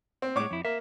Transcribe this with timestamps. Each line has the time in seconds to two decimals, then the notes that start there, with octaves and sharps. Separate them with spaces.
0.22 C4
0.36 A2 G#3 C#5 D6
0.51 F2 E4
0.65 A#3 E5